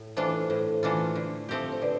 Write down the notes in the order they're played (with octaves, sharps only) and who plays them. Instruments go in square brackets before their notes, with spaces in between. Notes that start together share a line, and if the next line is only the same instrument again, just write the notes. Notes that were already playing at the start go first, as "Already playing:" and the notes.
Already playing: [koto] A2
[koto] E3 A3 D4 F4 [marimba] A4 C5
[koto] A2 [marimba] A4 C5
[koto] E3 A3 D4 F4
D3
F3 A3 C4 G4
[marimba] C5
[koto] D3 [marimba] B4 D5